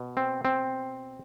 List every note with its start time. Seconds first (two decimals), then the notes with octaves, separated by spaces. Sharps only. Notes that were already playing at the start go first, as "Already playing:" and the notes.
Already playing: B2
0.17 C4
0.45 C4